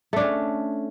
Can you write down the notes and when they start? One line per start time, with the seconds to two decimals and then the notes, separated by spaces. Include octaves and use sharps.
0.13 A3
0.16 D4
0.20 C#4